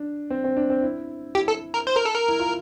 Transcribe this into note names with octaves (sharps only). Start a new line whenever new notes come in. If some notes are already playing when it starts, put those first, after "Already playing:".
Already playing: D4
C4
C4
D4
C4
E4
E4 G4
A4
A#4
C5
A#4
A4
A#4
E4
F4